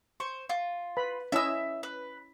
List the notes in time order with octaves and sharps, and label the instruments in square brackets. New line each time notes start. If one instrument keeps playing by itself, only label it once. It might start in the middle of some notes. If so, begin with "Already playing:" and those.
[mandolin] C5 [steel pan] C#6
[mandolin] F4
[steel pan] B4 B5
[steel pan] C#4 E4 D#5 [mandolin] E5 E6
[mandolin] B4